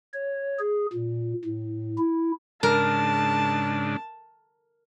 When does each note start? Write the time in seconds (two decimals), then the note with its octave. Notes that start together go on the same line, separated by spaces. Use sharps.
0.14 C#5
0.60 G#4
0.93 A#2
1.45 A2
1.98 E4
2.63 G#2 C#3 D4 A#4 A5